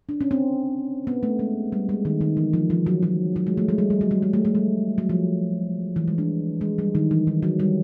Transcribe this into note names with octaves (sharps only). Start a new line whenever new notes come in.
D4
C#4
C4
B3
A3
G#3
G3
G#3
D#3
D#3
E3
F3
F3
F#3
F#3
F#3
G#3
A3
G#3
G3
G3
F#3
G3
G#3
A3
A3
G3
F#3
F3
E3
G#3
D4
G#3
G3
D#3
E3
D#3
F#3
G3